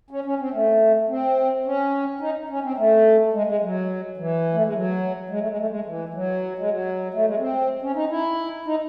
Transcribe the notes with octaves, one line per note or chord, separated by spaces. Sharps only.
C#4
C#4
C4
A3
C4
C#4
D#4
C#4
C4
A3
G#3
G#3
F#3
E3
A3
G#3
F#3
G#3
A3
G#3
A3
G#3
E3
E3
F#3
G#3
F#3
A3
G#3
C4
C#4
D#4
E4
D#4